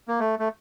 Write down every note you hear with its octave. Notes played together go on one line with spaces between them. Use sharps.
A#3
A3
A3